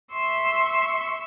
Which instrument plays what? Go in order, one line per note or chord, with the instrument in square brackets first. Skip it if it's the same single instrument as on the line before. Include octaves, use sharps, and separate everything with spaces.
[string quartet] E5 C6 C#6 E6